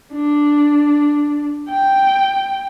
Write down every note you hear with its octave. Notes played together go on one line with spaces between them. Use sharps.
D4
G5